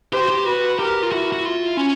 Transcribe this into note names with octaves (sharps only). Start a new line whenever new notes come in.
G4 C5
F#4
G4
F#4 B4
G4 A#4
F4
E4 F#4
F#4
F4
C#4